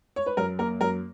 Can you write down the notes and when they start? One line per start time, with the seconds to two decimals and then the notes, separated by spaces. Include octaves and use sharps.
0.16 C#5
0.26 B4
0.37 F#2 A#4
0.59 A#3 A#4
0.81 F#2 A#4